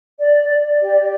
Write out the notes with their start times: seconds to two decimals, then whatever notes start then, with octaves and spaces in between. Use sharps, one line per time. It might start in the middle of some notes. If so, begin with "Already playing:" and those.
0.19 D5
0.49 D5
0.79 G4